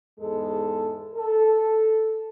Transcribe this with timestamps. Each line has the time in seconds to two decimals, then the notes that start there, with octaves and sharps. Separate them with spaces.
0.20 E2 G#2 G#3 A4
1.14 A4